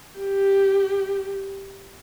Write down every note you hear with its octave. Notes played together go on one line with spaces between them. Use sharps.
G4